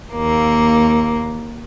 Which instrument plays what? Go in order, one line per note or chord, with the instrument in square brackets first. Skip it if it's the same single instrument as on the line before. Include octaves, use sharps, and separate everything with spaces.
[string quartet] D#2 A#3